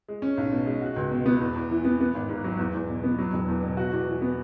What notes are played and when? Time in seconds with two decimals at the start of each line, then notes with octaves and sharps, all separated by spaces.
0.08 G#3
0.22 C#4
0.37 B1
0.52 B2
0.66 G#3
0.82 F#4
0.96 C#2
1.11 B2
1.26 B3
1.40 E2
1.56 E2
1.71 E3
1.85 B3
2.01 B3
2.15 G#1
2.29 G#2
2.44 F#3
2.59 E2
2.74 E2
2.88 B2
3.04 B3
3.19 F#3
3.33 E1
3.48 E2
3.63 B2
3.77 F#4
3.92 E2
4.07 E3
4.22 B3